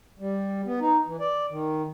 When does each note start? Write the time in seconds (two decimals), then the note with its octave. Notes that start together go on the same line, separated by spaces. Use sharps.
0.19 G3
0.65 B3
0.80 D#4
1.07 E3
1.20 D5
1.50 D#3